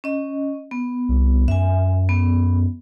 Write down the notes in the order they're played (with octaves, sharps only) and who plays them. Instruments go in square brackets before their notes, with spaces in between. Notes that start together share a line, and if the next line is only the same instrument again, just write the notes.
[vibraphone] C#4 D#5
B3
[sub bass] C2
[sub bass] F#2 [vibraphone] E5 G#5
[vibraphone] B3